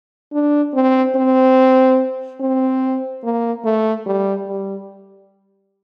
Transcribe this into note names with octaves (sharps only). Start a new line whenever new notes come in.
D4
C4
C4
C4
A#3
A3
G3
G3